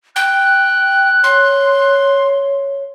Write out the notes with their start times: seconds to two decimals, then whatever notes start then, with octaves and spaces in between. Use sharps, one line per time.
0.16 G5 F#6
1.24 C#5 C6